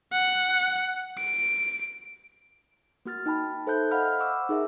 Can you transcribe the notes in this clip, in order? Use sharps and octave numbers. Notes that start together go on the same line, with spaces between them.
F#5
D7
A#3 F#4 F6 A6
D#4 G5 A5 B5
A4 C5 E5 A5 F#6 G6
C5 D#5 F5 F#5 B5 F6
F#5 C#6 D6 E6
D#4 G#4 A#4 E5